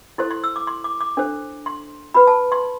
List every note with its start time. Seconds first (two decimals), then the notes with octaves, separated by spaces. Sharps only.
0.18 E4 A4 C5 C6
0.31 C6
0.44 E6
0.56 D6
0.67 C6
0.84 D6
1.01 D6
1.17 D4 A4 C5
1.66 C6
2.14 F#4 B4 B5
2.27 A5
2.52 C6